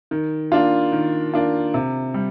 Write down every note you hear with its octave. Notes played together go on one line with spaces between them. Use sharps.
D#3
A#3 D4 F4
D#3
A#3 D4 F4
C3
G3